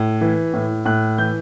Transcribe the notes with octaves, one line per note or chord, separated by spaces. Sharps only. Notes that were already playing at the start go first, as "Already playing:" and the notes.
Already playing: A2
E3
A2
A2 F#6
E3 G6